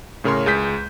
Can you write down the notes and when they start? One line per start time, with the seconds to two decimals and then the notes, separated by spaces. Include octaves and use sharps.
0.24 A2 C#3 A#4 C#5 C6
0.46 C#2 G#4 G6 B6